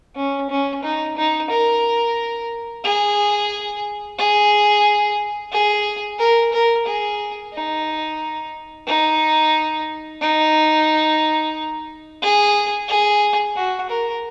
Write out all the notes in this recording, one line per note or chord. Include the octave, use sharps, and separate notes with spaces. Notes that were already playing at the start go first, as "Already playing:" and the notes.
C#4
C#4
D#4
D#4
A#4
G#4
G#4
G#4
A#4
A#4
G#4
D#4
D#4
D#4
G#4
G#4
F#4
A#4